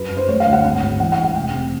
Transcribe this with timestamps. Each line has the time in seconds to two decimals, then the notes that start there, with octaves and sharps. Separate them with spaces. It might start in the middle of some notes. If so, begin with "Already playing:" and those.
Already playing: F#2 B4
0.11 F#2
0.17 C5
0.28 A3 C#5
0.40 F5
0.46 D2
0.53 F#5
0.64 G#1 F#5
0.82 G#2
1.00 E3 F#5
1.12 F#5
1.18 G#3
1.24 F#5
1.36 F1 G5
1.54 C3